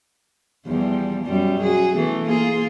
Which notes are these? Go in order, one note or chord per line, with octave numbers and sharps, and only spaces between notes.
E2 F3 G3
F#2 G3
F#4 G#4
E3 A3 B3
A#3 F4 G#4